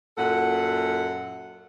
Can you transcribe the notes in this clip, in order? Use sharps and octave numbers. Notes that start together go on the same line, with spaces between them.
F#2 A#2 A4 F#5